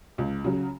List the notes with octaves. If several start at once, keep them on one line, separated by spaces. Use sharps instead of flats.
C#2
C#3 F#3